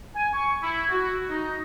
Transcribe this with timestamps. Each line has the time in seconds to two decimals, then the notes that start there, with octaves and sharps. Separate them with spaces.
0.15 G#5
0.33 C#6
0.63 E4
0.90 F#4
1.29 D#4